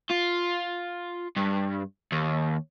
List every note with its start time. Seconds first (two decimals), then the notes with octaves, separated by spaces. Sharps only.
0.10 F4
1.37 G2
2.12 D#2